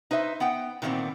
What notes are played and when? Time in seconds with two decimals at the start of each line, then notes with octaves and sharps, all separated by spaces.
0.11 D#4 B4 C5 E5
0.40 B3 F#5 G5
0.82 A#2 D#3 E3 G3 B3 C4